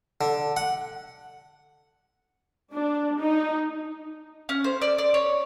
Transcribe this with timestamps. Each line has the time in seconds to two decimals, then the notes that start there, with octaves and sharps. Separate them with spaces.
0.21 D3
0.57 F#5
2.73 D4
3.19 D#4
4.49 C#4
4.64 C5
4.82 D5
4.98 D5
5.14 C#5